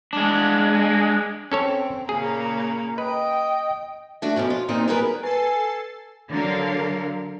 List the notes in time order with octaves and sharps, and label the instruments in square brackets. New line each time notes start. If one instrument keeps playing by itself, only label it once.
[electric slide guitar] G#3 D4
[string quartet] C4 [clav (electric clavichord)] C#4 A4 C#5
[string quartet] A#2 C#3 A#3 [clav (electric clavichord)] G#4
[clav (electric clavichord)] B4 [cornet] D#5 [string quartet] G5
[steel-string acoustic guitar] A3 D4 F#4
F#2 B2 F3 C#4
F4
A#2 D#3 C4 D#4
G3 A#3 B3 G#4 A#4 B4
[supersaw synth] A4 A6 C7 [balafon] B4 [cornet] G#5
[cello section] D3 F#3 A4 A#4 F5